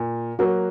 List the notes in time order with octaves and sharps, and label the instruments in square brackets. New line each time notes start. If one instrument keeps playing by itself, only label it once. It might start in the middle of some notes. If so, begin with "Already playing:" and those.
Already playing: [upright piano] A#2
[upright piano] F#3 A#3 [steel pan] F#4